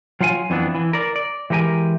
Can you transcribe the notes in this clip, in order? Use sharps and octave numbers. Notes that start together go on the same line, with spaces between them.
F#3 F4 F5 F#5 G#5
F2 E3 B3 D4
E3
A#4 D5
D5
E3 G#3 G4 A#4 G#5